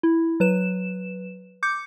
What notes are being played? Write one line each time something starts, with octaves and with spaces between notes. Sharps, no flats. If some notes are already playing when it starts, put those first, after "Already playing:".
E4
F#3 B4 E7
D6 G6 C#7